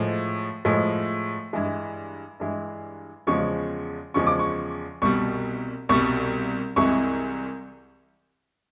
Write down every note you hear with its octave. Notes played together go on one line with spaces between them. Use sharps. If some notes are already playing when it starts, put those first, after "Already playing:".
Already playing: A2 F3 G#3
A2 F3 G#3
G2 E3 G#3
G2 E3 G#3
E2 C#3 F3 G#3 C#6
E2 C#3 F3 G#3 C#6
D6
C#6
C2 B2 G3 C#6
C2 B2 G3 C#6
C2 C3 E3 G#3 C#6